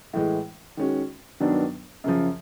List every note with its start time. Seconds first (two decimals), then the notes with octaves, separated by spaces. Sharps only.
0.13 A2 E3 G#3
0.77 D#3 G#3 C#4 F#4
1.40 G2 D#3 F#3 B3 D4
2.04 F#2 C#3 F3